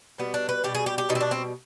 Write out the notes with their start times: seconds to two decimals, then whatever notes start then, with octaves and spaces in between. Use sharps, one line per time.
0.18 B2 G3 B3
0.34 D4
0.49 B4
0.64 B2 G3 G4
0.75 G#4
0.86 G4
0.98 G4
1.09 B2 G3 D#4
1.15 C4
1.21 D4
1.31 C4